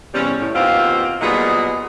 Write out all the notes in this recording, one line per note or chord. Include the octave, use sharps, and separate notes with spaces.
E2 C3 G3 C#4
A2
D#2 B2 A#3 C4 F4
A#2 F#3 G3 B3 D#4 G#4